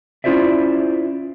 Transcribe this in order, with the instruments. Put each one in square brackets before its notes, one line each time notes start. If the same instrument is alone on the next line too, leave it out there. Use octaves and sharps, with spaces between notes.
[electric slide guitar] C#4 E4 F4 C5 D5 E5